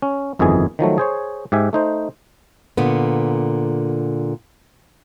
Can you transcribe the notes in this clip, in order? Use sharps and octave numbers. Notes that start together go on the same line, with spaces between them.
C#4
G1 F2 D#3 E3 G#4 G#5
D#3 F3 F#3 A3
G#4 C5 C#5
G#2 G4 E5 G#5
A3 D#4 C5
A#2 D3 B3